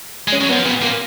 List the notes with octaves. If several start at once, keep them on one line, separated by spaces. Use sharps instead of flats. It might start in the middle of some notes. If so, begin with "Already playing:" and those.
G#3
C#4
F#3
B3
F3
A#2 B3
A#2 A#3